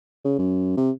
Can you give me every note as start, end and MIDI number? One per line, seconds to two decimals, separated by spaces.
0.25 0.36 49
0.38 0.74 42
0.77 0.91 48